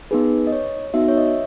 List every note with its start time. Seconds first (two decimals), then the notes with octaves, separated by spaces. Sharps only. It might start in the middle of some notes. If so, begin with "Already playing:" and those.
0.11 B3 D#4 G#4 B4
0.47 D#5
0.52 C#5
0.94 B3 D#4 F#4 E5
1.08 C#5
1.17 D#5
1.25 E5